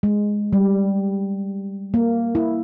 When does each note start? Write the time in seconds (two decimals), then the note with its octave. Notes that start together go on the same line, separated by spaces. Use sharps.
0.03 G#3
0.53 G3
1.94 A#3
2.35 E4